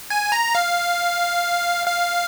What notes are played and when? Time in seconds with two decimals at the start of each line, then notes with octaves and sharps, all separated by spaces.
0.10 G#5
0.32 A#5
0.55 F5
1.87 F5